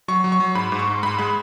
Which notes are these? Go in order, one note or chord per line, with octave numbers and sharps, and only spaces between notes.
F#3 C#6
F#3
C#6
F#3
G#2 B5
G#2
C#6
G#2
G#2 B5
G#3 B5